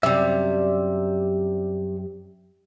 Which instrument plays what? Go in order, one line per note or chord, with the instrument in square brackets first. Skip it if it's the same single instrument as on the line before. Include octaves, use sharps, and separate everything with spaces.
[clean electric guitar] F#2 E5 [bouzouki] C3 G3